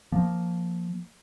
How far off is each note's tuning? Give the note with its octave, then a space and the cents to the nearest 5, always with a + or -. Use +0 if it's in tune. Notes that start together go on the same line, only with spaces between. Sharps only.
F3 +0 A#3 +0